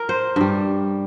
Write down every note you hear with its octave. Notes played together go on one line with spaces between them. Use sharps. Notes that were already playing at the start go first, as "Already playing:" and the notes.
Already playing: A#4
C5
G2 G3